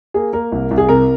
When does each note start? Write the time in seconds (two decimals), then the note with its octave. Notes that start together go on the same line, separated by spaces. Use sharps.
0.14 A#3 G#4
0.33 A#3 A#4
0.52 C2
0.71 C2
0.78 G#4
0.89 C3 A#4